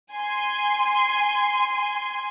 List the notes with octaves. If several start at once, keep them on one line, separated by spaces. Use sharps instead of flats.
G#5 C6